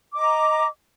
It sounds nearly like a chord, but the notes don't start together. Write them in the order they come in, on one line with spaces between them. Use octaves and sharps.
D6 D#5 A#5